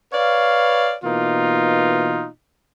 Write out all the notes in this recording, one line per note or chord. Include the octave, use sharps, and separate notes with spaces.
B4 C#5 D5 F5
B2 E3 A#3 D#4 F4